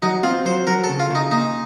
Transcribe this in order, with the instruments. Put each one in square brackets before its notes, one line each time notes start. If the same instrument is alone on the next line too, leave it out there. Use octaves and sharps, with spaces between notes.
[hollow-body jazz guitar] F#3 [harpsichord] D#4
[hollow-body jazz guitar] C4 [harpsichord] F4
[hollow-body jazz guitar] F#3 [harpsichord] C5
[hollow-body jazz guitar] F#3 [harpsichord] A#4
[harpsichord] A4
[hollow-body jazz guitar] C#3
[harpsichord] F4
[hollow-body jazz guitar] C#3 [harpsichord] D#4
[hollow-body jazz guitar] A#2 [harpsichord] D#4